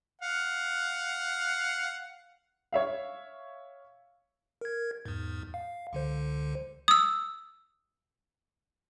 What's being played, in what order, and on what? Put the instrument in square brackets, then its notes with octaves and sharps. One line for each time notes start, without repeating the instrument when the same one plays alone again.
[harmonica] F5 F#5
[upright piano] C#5 E5 F5
[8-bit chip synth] A#4 G#6
E2 G#2
F5
C#2 D3 C5
[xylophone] D#6 E6